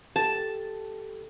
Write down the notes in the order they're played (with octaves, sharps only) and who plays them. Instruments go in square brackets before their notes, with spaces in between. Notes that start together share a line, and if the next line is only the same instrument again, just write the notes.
[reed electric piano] G4 A4 [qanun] A5